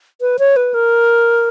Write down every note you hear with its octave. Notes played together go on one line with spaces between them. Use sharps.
B4
C#5
B4
A#4